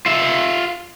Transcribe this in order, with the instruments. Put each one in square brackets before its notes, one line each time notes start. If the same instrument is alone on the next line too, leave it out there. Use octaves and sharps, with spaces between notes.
[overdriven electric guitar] F4 E5